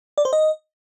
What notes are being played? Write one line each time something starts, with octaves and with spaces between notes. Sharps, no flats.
D5
C5
D#5